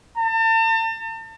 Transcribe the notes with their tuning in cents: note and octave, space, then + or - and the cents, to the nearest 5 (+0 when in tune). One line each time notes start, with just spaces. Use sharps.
A5 +40